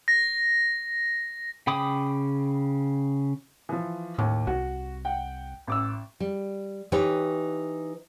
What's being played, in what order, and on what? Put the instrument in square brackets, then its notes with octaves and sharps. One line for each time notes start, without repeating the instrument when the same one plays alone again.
[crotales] A#6
[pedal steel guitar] C#3 G5 B5 D6 D#6
[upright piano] E3 F3
[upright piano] D#2 D6 [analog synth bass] A2
[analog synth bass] C2 [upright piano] F#4
[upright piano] F#5 G5
A1 D6 E6
[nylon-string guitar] G3
E3 D#4 G4 B4 C#5